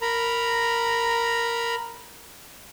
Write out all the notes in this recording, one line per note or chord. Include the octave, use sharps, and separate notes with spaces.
A#4 A#5 B5